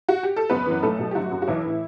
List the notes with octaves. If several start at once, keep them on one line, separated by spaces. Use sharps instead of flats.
F#4
G4
A4
F#1 B3 B4
F#2 E3
B1 A3 A4
B2 F#3
G4
G1 F#3 F#4
F#2 F#3
F#4
B1 E3 E4
A2 E3